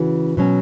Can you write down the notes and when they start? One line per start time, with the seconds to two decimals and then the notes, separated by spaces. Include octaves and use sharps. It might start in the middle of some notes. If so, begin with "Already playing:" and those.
Already playing: C#3 E3 C#4 F#4
0.37 B2 F#3 C#4